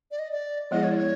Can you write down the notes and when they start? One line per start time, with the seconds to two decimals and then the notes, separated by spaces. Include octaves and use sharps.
0.11 D5
0.19 D#5
0.32 D5
0.71 F3 G#3 B3 E4 G#4 D#5
0.83 C#5
0.92 D5
0.96 C#5